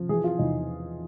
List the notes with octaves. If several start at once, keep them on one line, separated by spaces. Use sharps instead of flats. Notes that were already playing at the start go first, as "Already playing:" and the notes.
Already playing: F3
E3 G#4
F4
E2 D#4